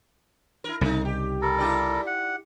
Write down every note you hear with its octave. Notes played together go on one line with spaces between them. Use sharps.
E4 A#4
C2 C#3 A3 D#4
G4
G3 A4 A#4
E4 G4 D5
F#5